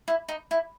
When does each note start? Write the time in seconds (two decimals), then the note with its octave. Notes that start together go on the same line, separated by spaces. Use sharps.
0.08 E4
0.28 D#4
0.51 E4